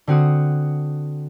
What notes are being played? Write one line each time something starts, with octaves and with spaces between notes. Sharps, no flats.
D3 C4 F#4 D#6